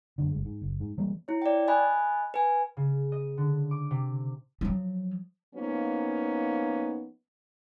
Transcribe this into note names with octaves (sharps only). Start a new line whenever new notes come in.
F#2 D3
F#1 G#3
G#2
F#1
G#2
E3 G3 G#3 A#3
E4 C#5
D5 G5
D#5 G#5 B5 F#6
B4 G#5
C#3
D#5
D3
D6
C3
F3 F#3
F3 A#3 B3 C#4 D#4